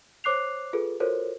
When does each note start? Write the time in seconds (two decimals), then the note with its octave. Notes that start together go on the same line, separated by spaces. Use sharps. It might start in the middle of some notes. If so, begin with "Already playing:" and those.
0.24 C5 C#5 D6 F#6 C7 F7
0.73 F4 G#4 A4 B4
1.00 F4 F#4 A4 A#4 C5 C#5